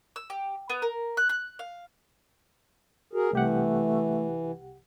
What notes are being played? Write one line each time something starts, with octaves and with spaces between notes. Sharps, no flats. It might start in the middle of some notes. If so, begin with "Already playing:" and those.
E6
G4
B3
A#4
F#6
F#6
F5
F#4 G#4 A#4
C2 E3 A3 G4 F#5